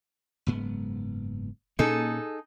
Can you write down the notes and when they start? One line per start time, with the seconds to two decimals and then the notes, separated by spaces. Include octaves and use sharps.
0.47 F#1 G#2 B3
1.79 A#2 A#3 C#4 D#4 G#4 A4